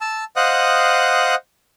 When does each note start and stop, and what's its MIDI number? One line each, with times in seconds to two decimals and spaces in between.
0.01 0.24 81
0.01 0.24 88
0.36 1.35 72
0.36 1.35 75
0.36 1.35 77
0.36 1.35 78
0.36 1.35 87
0.36 1.35 90